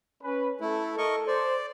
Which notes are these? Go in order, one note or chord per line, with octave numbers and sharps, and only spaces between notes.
C#4 B4
A3 E4 A4
A#4 D#5 C#6
C5 D5